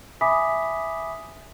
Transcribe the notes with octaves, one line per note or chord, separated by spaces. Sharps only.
E5 G#5 B5 D6 D#6 B6